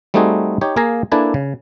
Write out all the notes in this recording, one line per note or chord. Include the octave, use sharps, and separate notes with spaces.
G3 A3 C4 D#4 F#4 G#4
D#4 G4 C#5
A#3 G#4 F5 G#5 A#5
A#3 D4 E4 A4 B4 G#5
C#3